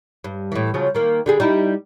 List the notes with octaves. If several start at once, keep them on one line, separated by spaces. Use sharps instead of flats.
G2
A2 E3
C#3 F3 F#3
D#3 A#3
D3 G3 G#4
G3 D#4 E4